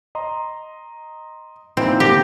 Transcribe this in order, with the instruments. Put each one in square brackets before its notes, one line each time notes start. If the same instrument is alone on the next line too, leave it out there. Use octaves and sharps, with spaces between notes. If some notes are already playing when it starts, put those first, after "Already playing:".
[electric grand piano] D#5 A#5 C6
[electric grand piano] A#2 D#4 E4 [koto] C4
[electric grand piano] D3 A#3 A#6 [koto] G4